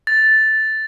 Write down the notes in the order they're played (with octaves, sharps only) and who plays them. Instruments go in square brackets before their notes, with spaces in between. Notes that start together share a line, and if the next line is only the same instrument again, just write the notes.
[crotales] A6